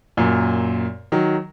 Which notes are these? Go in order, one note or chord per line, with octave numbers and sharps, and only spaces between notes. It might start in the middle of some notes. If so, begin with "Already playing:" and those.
F#2 A#2
D#3 F#3